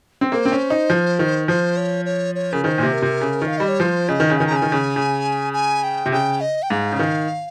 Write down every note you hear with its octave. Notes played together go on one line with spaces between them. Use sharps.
C4
A#3 C5
C4
C#4
D#4
F3
D#3
F3 C5
C#5
C#5
C#5
C#3 A#4
D#3 C5
A#2
C3
A#4
C3
C#3
D#3
F5
G3 D#5
C#5
F3 C5
C#3 D#5
D#3
C#3
D#3 G#5
C#3 A#5
G#5
D#3
C#3
C#3
G#5
G5
C3
C#3 G5
D#5
G5
G#2 F5
C#3
D#3